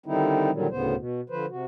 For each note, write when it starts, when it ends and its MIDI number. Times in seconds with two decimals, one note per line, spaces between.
0.06 0.51 50
0.06 0.51 51
0.06 0.51 55
0.06 0.51 60
0.06 0.51 63
0.06 0.51 64
0.51 0.67 46
0.51 0.67 50
0.51 0.67 51
0.51 0.67 54
0.51 0.67 55
0.71 0.95 38
0.71 0.95 45
0.71 0.95 49
0.71 0.95 59
0.71 0.95 72
0.96 1.21 47
1.30 1.46 50
1.30 1.46 53
1.30 1.46 71
1.30 1.46 72
1.50 1.65 48
1.50 1.65 66